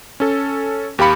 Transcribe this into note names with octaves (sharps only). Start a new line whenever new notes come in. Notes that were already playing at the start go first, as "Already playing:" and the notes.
C#4 A4
D#2 G4 F5 B5 C#7